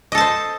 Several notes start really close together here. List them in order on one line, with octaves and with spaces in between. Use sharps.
D#5 A4 A5 C5